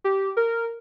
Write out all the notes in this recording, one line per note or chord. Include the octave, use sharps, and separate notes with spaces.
G4
A#4